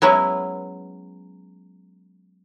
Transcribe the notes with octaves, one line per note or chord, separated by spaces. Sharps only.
F#3 G#3 B3 C#4 E4 B4